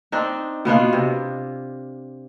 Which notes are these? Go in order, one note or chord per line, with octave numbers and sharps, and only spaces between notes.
C4 D4 D#4
B2 B3 D4 F4
C3